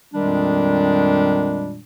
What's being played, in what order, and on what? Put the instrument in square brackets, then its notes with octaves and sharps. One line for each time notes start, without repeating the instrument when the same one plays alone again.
[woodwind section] F2 A#2 D#3 G3 G#3 D4